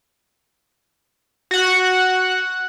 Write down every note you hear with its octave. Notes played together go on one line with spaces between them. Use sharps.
F#4 F#5